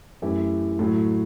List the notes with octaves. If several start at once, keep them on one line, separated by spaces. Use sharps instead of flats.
F#2 E3 A3 E4 G4
A2 F#3 A3